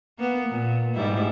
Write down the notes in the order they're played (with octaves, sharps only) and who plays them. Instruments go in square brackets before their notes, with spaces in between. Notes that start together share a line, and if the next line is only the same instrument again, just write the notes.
[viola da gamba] A#3 B3
A#2
G#2 G3 E4